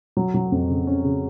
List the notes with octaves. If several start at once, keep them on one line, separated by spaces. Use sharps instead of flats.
F#3
F#3
F2
C#3
C#4
C#3